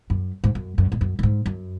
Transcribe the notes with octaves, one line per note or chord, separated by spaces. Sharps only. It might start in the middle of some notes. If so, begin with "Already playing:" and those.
F#2
G#2
F#2
F#2
G#2
F#2
F#2
G#2
F#2